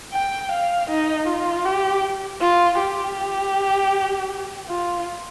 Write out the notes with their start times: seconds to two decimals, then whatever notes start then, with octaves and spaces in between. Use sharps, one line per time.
0.14 G5
0.52 F5
0.90 D#4
1.28 F4
1.66 G4
2.41 F4
2.80 G4
4.69 F4